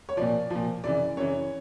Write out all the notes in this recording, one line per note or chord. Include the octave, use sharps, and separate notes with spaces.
C#5
A#2 F3 D5
A#2 F3
F#2 C#3 E3 D5
F#2 C#3 E3 C#5